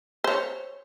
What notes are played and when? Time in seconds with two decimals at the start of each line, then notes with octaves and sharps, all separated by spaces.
0.24 C5 C#5